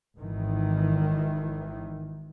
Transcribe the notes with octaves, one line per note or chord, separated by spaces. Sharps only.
G#1 D#3 E3